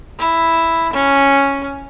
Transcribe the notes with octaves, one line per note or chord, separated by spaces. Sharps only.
E4
C#4